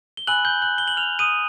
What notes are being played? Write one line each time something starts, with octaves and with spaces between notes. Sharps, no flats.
G7
G#5 B5 E6 F#6 F#7
G6 G7
F#6 F#7
G7
F#7
F6 F7
D#6 D#7